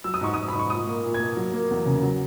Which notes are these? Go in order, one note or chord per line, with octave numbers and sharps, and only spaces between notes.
F#3 E6
D#6
G#2 C#6
G#2 D#6
B5
G#2
C#6
A#2 D#6
A#3
A#2
G#6
A#3
F#3
A#3
E2
C#3
F#3